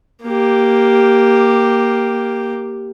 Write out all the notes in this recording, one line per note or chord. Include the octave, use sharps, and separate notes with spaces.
A#3 G4